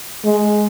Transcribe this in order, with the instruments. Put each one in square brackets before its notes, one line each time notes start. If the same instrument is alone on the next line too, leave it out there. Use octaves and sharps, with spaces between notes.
[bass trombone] G#3